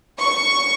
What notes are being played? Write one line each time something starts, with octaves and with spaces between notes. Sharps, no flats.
C#6